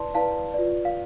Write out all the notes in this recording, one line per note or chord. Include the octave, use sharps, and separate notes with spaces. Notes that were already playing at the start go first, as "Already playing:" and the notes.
Already playing: E4 B4 D5 A5 C6
E4 B4 D5 F5 A5
F4 B4 D5
F5